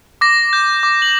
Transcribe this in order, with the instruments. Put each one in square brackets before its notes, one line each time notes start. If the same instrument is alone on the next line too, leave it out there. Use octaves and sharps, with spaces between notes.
[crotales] D6 A#6
G6
D6
F#7